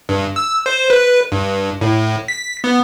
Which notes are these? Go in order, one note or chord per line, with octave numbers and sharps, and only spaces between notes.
G2
E6
C5
B4
G2
A2
B6
B3